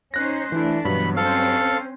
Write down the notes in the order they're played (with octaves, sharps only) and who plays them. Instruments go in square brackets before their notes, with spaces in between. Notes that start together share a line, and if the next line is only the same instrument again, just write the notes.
[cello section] C#4 D#4 C5 [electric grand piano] F#6 A#6
[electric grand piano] E3 E4 [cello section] A3 D4
[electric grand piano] G2 F#3 [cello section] B2 E3 B3 [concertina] B5
[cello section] C4 C#4 C5 [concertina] A4 F5